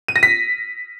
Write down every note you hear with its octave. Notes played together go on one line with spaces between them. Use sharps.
D#7
A#6
B6